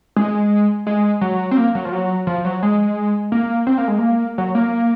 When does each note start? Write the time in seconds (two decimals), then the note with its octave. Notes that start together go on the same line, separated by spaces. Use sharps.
0.16 G#3
0.87 G#3
1.21 F#3
1.51 C4
1.57 A#3
1.75 F#3
1.85 F3
1.92 F#3
2.27 F3
2.45 F#3
2.63 G#3
3.32 A#3
3.67 C4
3.78 A#3
3.88 G#3
3.99 A#3
4.38 F#3
4.55 A#3